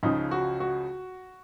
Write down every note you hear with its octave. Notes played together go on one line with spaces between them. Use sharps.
C#2 C#3 F3 D#4
F#4
F#4